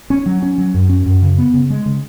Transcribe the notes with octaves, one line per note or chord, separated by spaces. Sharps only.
C#4
F#3
C#4
F#3
F#2
C#4
F#2
C#3
B3
C#3
G#3
C#3